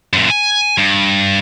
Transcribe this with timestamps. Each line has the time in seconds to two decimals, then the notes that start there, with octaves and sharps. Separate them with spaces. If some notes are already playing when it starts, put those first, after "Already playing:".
0.13 F#2 A#2
0.30 G#5
0.78 G2